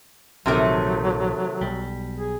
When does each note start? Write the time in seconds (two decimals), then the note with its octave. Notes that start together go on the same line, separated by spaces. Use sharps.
0.46 A#1 C3 D#3 F#3 A3
1.61 B1 G3
2.17 G#4